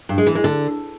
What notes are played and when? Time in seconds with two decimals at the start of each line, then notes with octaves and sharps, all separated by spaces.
0.09 G2
0.18 G#3
0.27 E3
0.35 G#3
0.44 D3